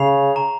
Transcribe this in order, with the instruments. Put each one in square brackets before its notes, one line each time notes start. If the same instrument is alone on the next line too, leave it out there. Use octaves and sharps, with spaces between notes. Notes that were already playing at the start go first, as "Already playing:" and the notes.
Already playing: [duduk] C#3 [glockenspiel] C7 F7
[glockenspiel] A#5